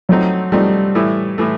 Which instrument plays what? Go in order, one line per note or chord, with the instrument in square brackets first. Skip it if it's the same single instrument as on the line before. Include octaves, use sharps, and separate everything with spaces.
[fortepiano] F3 A3 C4 D#4 [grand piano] F#3
[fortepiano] F3 A3 C4 D#4 [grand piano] G3
[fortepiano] A2 E3 A3
A2 E3 A3